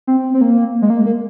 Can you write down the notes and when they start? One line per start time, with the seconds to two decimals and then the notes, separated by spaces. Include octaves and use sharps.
0.07 C4
0.34 C4
0.41 A#3
0.82 G#3
0.90 A#3
1.01 G#3
1.06 A#3